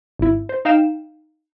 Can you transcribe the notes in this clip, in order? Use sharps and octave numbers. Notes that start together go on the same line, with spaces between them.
G#1 E4
C5
D#4 F5 G5 E7